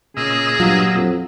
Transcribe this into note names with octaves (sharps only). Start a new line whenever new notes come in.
A#2 C#3 G#4 D#5 E6
G2 F#3 F4
F2